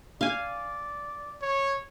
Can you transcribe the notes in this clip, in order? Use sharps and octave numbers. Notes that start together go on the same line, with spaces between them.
D5 F5 G#5
C#5